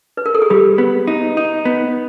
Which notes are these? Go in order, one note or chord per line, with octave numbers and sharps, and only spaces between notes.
B4
A#4
A4
G#4
G3 G4
B3
D#4
D#4
B3